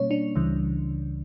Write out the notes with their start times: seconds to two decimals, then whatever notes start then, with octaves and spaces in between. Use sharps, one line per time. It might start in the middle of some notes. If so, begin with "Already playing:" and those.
Already playing: B2 G3 A#3 C#4 C#5
0.11 D4
0.36 C#2 C#3 E3 G3